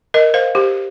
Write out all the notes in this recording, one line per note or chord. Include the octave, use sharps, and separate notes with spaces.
A#4 D#5
C5 F5
G4 C5